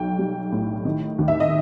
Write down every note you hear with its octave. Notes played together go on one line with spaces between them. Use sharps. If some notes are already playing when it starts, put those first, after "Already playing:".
Already playing: B1 G5
G3
A2
D#3
D#2
E5
D#5